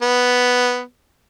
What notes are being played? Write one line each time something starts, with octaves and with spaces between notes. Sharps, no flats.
B3